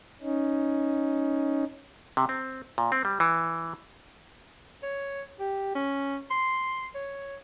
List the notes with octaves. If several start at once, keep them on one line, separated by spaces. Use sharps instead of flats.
C#4 D#4
C3
C4
A#2
C4
G3
E3
C#5
G4
C#4
C6
C#5